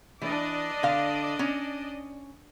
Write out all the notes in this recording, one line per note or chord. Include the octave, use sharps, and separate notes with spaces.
E3 D4 D5 D#5
D3 F5
C#4